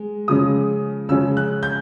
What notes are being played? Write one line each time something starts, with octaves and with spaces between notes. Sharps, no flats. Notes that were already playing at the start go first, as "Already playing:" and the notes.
Already playing: G#3
C#3 F3 G#3 C#4 D#6
C#3 F3 G#3 C#4 E6
F#6
G6